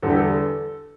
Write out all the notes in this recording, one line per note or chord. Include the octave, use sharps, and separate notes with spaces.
E2 D3 G3 A4
G4
A4